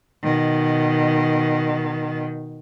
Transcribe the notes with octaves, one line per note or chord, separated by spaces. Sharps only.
B2 D#3